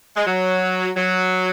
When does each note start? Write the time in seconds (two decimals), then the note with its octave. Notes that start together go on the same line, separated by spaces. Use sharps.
0.16 G#3
0.27 F#3
0.97 F#3